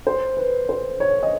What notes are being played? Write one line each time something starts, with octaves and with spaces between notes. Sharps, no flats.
C5
B4
C5
C#5
D#5